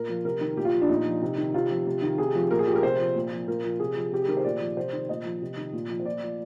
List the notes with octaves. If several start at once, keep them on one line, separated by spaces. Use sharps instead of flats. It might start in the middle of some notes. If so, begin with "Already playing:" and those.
Already playing: A#2 A#4
F3
C3 A#4
D#3
A#2 G4
F4
F3
D4
A#2 D#4
F3
C3
D#3
C3 F4
F3
C3
D#3
C3 G#4
F3
A#2 A#4
G#4
F3 G4
A#4
C3 C5
F3
A#2
F3
A#2 A#4
F3
C3 G#4
F3
C3 G4
G#4
D#3 A#4
C5
A#2 D5
F3
C3 C5
D#3
A#2 D#5
F3
C3
D#3
A#2
F3
C5
A#2 D5
F3